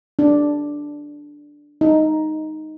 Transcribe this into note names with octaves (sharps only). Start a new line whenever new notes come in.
D4
D#4